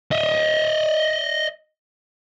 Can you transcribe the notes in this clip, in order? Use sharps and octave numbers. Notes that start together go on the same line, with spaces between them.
D#5 E5